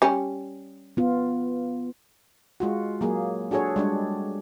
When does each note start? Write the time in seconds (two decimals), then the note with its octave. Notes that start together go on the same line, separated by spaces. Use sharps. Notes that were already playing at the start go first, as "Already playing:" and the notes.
0.02 G3 C#4
0.97 B3 F4
2.60 G#3 F4 F#4
3.01 F#3 A#3 G#4
3.51 D4 F#4 G#4 A4 C#5
3.76 G3 G#3 D4